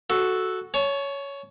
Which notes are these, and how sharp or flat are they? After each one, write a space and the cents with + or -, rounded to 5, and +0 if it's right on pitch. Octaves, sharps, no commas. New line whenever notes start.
F#4 +0 A4 -5
C#5 +10 A5 -35